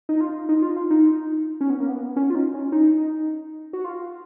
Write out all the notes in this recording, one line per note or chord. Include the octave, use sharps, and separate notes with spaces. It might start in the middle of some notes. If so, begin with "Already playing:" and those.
D#4
F4
D#4
F4
F4
D#4
C#4
B3
A#3
B3
C#4
F4
D#4
C#4
D#4
F#4
F4